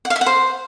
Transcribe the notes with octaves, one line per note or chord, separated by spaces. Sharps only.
F#5
F5
E5
F#5
C5